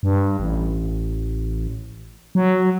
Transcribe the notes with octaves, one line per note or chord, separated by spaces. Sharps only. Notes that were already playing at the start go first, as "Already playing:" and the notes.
G2
A1
F#3